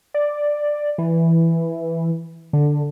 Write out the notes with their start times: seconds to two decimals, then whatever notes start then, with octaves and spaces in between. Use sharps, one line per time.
0.14 D5
0.98 E3
2.53 D3